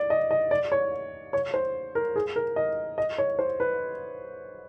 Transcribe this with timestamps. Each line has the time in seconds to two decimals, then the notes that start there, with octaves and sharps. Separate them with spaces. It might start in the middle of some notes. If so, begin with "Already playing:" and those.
Already playing: D5
0.10 D#5
0.31 D#5
0.51 D5
0.72 C#5
1.33 C#5
1.54 C5
1.95 A#4
2.16 G#4
2.36 A#4
2.56 D#5
2.98 D#5
3.18 C#5
3.39 C5
3.60 B4